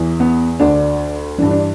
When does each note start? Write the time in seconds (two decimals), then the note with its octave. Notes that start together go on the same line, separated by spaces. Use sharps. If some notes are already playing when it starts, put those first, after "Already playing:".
Already playing: E2 E3
0.20 B3
0.60 D2 D3 D4
1.38 E3 D4
1.42 G2
1.51 D4